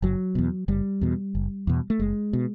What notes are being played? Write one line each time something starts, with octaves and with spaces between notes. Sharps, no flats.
F#1 F#3
E2 B2
F#1 G3
E2 B2
F#1
E2 B2
A3
F#1 G#3
B2